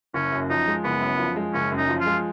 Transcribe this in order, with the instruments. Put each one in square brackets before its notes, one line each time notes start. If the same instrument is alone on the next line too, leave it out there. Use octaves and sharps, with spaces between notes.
[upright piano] F#1 [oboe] C#4
[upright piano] F#2
[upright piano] F3 [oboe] D#4
[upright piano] G#3
[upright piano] F#1 [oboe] B3
[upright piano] F#2
F3
G#3
[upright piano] F#1 [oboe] C#4
[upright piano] F#2
[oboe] D#4
[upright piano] F3
[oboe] F4
[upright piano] G#3